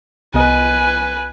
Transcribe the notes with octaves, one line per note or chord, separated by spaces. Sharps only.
C2 B3 B4 D#5 G#5